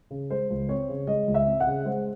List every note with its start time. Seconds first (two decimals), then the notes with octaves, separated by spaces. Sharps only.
0.10 C#3
0.30 G#3 C5
0.50 C#2
0.69 C4 C#5
0.89 C#3
1.07 G#3 D#5
1.28 C#2
1.34 E5
1.47 C4
1.60 F#5
1.67 C#3
1.85 G#3 C5